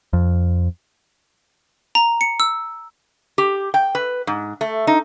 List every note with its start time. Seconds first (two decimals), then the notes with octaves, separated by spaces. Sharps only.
0.13 F2
1.95 A#5
2.21 C#7
2.40 E6
3.38 G4
3.74 G5
3.95 B4
4.27 G#2
4.61 A3
4.87 D#4